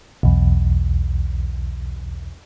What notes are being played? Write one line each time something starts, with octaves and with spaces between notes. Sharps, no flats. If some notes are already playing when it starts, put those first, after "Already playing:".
B1 E2